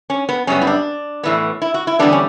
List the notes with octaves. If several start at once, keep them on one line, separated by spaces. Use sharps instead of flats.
C#4
B3
F#2 C#3 G3 B3 C#4
E4
D4
A2 E3 B3
E4
F#4
E4
E2 D3 G3 B3 D4
C#4